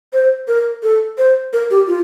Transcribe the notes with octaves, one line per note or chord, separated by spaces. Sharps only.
C5
A#4
A4
C5
A#4
G4
F4